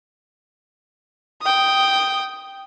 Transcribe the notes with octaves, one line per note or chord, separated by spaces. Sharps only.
G5 D#6